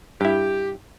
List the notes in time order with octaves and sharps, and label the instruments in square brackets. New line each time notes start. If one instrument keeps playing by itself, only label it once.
[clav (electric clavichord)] G2 E4 [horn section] G4